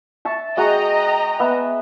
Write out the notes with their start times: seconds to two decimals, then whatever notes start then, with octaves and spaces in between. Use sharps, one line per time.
0.25 E5 A5 C#6
0.57 G#3 F#4 D#5 G5 A#5 C#6
1.40 B3 E5